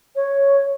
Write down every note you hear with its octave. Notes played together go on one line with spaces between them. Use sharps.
C#5